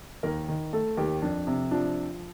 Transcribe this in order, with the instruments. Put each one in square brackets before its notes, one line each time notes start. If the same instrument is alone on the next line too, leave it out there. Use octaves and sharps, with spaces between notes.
[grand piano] D#2 A#4
D#3
A3 A4
D#2 G4
F2 D4
C3
F3 D4